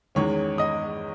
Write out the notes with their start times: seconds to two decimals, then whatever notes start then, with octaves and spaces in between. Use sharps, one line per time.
0.15 E2 D#3 G#3 C#4 C#5 C#6
0.58 D#5 D#6